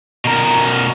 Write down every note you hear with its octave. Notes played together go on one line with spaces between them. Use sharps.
B2 A#4